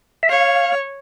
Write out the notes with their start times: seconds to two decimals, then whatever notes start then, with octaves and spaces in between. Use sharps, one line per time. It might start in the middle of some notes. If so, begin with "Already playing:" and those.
0.23 E5
0.29 C#5 F5